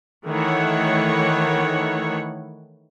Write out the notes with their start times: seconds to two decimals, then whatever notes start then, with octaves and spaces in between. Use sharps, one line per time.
0.28 D#3 E3 A3 C#5 F#5